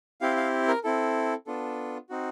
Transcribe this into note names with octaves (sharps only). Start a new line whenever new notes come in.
C4 E4 G4 F5
F5
A#4
C4 E4 A4
B3 D4 F4 A4
C4 D#4 F#4